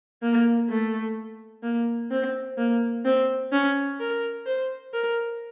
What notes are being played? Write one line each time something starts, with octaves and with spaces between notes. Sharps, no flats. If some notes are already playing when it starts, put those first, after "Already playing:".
A#3
A3
A#3
C4
A#3
C4
C#4
A#4
C5
A#4